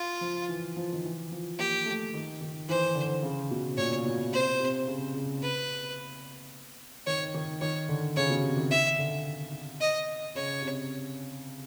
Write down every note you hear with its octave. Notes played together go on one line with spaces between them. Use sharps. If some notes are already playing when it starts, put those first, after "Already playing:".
Already playing: F4
F3
E3
F3
D#3
E3
F3
A#3 G4
A3
D#3
D#3
E3 C5
D3
C#3
B2
A#2 C#5
B2
C3 C5
C3
C#3
C#3
B4
D#3 C#5
D#3
D#3 C#5
D3
C#3 C#5
B2
C3
D#3
E5
D3
D#5
C#3 C#5
C3